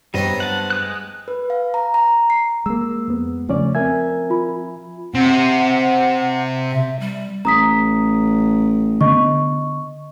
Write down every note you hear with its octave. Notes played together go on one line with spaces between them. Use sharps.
G2 F#3 G3 B3 C4 D#5
F#5 A5
G#3 D#6 F#6
B4
F5
A#5
A#5
C7
G#3 A#3 E6
F2 B3
E2 C#3 F3 A3 C#4 D5
C4 A#4 E5 G#5 G#6
F4 B5
C3 F#5
E5
G3
A1 A#5 D#6 B6
D3 B3 D#5 C#6